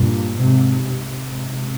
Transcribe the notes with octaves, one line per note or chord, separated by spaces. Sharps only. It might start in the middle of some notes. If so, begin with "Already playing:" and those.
Already playing: G2 A#2
G#2 C3
G#2 C3